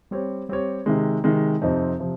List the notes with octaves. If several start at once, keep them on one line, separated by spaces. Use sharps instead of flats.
G3 C4 G4 C#5
G3 C4 G4 C#5
C3 D#3 G#3
C3 D#3 G#3
F2 C3 F3 C4 D#4
C3 F3